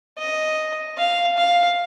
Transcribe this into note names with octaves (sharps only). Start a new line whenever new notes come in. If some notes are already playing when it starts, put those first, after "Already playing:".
D#5
F5
F5